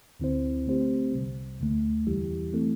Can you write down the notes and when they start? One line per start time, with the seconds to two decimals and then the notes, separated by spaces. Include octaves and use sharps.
0.20 D2 D3 C4 E4 C5
0.66 D3 A3 C4 G4 C5
1.13 C2 C3 G3
1.59 D2 D3 A3
2.07 E2 E3 G3 E4 G4
2.53 E3 A3 C4 E4 A4